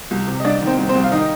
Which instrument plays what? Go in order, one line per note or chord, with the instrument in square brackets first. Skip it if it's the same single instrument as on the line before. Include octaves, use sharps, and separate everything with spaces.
[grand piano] C2
C3
D#5
C2 D4 D5
D#3
C4 C5
C2
C4 C5
C2
F5
D#3 D#4 D#5